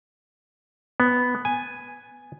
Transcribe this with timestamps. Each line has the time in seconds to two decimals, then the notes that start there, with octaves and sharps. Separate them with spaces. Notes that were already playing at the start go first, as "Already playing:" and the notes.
1.00 B3
1.45 G#5